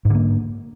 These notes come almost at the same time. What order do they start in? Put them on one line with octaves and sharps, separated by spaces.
G#2 D3 A#3